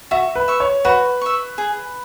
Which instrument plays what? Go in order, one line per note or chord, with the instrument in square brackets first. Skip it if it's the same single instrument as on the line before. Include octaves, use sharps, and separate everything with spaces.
[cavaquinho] F#4 [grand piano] E5
[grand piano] B4
[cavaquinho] E5 C#6
[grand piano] C#5
[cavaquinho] F#4 [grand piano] B4
[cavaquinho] E5 C#6
G#4